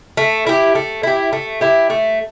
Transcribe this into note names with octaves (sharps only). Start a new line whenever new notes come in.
A3
E4 G4
A3
E4 G4
A3
E4 G4
A3